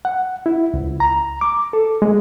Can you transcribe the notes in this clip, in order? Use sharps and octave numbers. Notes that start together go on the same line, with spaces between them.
F#5
E4
C#2
A#5
D6
A4
G#3